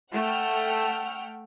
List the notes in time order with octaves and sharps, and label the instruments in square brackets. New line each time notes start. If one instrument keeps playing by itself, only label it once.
[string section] A3 [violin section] F#5 G5 F6